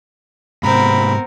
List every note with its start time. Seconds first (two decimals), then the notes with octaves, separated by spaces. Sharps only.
0.63 G#2 C3 B3 C4 A#4 B5